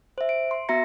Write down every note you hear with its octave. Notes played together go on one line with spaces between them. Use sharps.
C5 E5
D7
C6
B3 F#4 E5 A#5 A#6 C#7